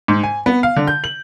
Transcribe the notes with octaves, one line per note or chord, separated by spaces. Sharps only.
G#2
G#5
B3
F5
D3
G6
F#7